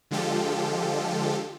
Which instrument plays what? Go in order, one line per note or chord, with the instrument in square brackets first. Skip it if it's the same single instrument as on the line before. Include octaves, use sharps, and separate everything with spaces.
[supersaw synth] D3 F3 G#3 F4 G4 A4